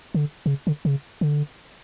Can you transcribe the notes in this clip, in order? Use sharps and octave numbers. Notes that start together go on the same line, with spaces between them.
D3
C3
C#3
D3
C#3
D3